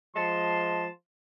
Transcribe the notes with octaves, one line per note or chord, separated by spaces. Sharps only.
F3 G#3 A5 C6